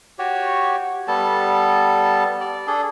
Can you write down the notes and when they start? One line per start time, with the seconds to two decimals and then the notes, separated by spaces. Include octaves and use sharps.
0.19 F#4 G4 C#5
1.08 G3 B3 A4 A5
2.40 D5
2.67 D4 G#4 A4